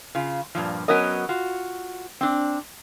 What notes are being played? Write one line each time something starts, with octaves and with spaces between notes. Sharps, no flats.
C#3 F4
G2 A#2 F3
F#3 B3 C#4 A#4 D#5
F4 F#4
C4 D4